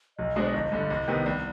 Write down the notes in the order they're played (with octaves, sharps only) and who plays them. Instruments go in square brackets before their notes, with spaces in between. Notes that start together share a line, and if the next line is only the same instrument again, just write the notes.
[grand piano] B1 [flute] D#5
[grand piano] B2 G#3 D4 [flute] C5
[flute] D5
[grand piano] G1 [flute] D#5
[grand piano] G2 D3
C2
C3 D#3 B3
[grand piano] C2 [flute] D5